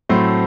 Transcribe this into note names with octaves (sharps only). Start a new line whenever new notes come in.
A2 F#3 A3 C4 C5